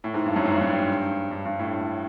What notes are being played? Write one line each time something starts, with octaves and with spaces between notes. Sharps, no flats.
A2
G#2
G2
F#2
G#2
G2
F#2
G2
G2
G2
A2